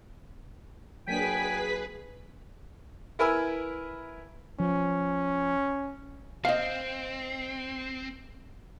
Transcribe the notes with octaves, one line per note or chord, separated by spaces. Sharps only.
F#3 A#3 D4 G#4 B4 G5 G#5 B6
E4 A#4 B4 G#5 E6
F3 C#4
C4 D#5 F5